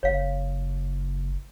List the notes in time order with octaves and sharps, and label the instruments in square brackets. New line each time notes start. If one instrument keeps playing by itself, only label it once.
[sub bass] F#1 [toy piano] C#5 F5